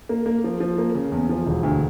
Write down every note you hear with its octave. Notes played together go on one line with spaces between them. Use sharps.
A#3
A#3
F3
F3
A#3
C#3
E2
F3
E1
D2